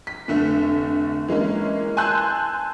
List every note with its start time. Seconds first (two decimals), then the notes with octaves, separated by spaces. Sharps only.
0.07 B6
0.28 F1 D3 A3
1.28 E3 G#3 A#3 C#4
1.97 G#5 A5 C6 E6 F#6 G6